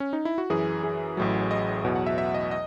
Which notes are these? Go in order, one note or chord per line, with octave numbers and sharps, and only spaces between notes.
C#4
D#4
E4
F#4
F#2 E3 G#4
G#4
A1 A2 F#3
D#5
E2 B2 F#3
F#5
E5
E5
D#5
D#5